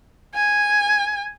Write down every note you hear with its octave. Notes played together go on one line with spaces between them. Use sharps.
G#5